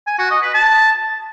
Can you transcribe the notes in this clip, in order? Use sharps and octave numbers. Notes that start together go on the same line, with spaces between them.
G#5
F#4
D#5
B4
A5